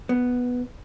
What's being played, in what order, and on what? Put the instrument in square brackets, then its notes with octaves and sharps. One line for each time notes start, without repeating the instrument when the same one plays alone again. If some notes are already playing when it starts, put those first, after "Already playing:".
[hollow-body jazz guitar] B3